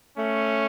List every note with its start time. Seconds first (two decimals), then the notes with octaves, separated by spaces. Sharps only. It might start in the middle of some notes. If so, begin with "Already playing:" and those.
0.18 A3 C#4